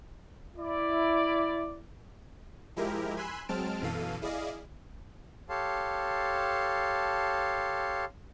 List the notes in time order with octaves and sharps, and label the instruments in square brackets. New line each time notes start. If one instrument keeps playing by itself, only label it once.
[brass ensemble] E4 D5
[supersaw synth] F3 G#3 E4 G4 A#4
G#5 B5 C6 E6 F#6
F#3 G#3 C4 A5 F6 D7
F#2 B2 E3 A4 F5 D#7
E4 G#4 D5 D#5 F5
[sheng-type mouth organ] G4 A4 C#5 F5 A5 C6